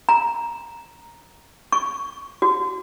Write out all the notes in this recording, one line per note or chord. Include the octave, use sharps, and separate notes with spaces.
A#5
C#6
F#4